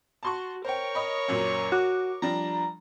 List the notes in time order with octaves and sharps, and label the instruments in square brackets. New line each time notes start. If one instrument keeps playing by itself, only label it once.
[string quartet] F#4 [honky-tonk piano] A5 C6 C#6
[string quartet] A#4 C#5 C#6 [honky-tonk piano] C5 G5
[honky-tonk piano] D#5 B5
F#2 A#2 F#3
[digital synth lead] F#4 [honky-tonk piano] D6
[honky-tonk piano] F3 G3 D4 [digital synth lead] A#5